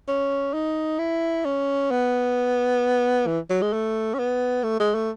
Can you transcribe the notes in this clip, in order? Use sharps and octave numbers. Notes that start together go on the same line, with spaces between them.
C#4
D#4
E4
C#4
B3
E3
F#3
G#3
A3
C#4
B3
A3
G#3
A3